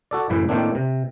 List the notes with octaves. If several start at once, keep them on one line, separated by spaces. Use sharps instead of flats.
F#4 A4 D5
F#2 A2 C#3 E3 B4
A2 D#3 A3 A#3 C4 D4
C3